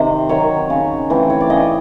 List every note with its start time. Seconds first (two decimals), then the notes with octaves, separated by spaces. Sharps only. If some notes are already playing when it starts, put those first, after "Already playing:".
Already playing: C3 D#3 C5
0.29 D#3 F#3 C#5
0.70 C#3
1.10 E3 A3 C4
1.30 C#5
1.41 D5
1.50 C#3 D#5